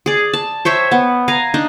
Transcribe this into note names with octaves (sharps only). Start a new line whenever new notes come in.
G#4 D5
A5
C5 C#5 E5 G5
B3
F5 G#5 A#5
D4 D#4